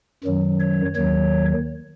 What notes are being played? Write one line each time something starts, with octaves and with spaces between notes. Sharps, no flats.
F#2 D#3 F#3
C#5
D#2 D#3 F#3 C#5